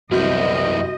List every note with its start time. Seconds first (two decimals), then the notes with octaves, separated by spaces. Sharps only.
0.11 C2 F#2 B3 E4 F#4 D#5 G6